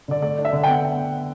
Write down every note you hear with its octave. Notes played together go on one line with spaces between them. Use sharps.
D3 D5
A3 D5
D4
E5
D3
G5
B3 F#5